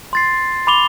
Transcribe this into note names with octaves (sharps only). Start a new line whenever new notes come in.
C6 A6 C7
B5 D6 F7 G7